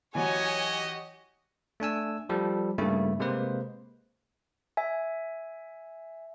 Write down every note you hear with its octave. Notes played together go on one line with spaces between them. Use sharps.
E3 F#3 F#4 G4 C#5 D#5 G#5
A3 D4 G#5 E6
F3 G3 A4
G2 C#3 A3 A#3 E4
C3 G#3 A#3 B4 C5
E5 G#5